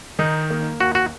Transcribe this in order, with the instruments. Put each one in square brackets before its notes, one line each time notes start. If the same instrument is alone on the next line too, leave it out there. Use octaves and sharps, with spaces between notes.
[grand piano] D#3 [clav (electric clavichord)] D#4
[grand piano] A#3
[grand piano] D#2 [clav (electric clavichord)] F#4
[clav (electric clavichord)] F#4